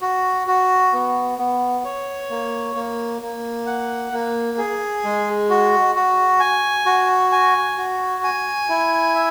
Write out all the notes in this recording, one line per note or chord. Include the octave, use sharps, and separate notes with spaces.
F#4
F#4
B3
B3
C#5
A#3
A#3
A#3
F#5
A#3
G#4
G#3
F#4
F#4
G#5
F#4
G#5
F#4
G#5
E4
E5